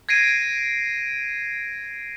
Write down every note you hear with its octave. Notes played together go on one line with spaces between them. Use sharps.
G#6 A#6 C7 D7 D#7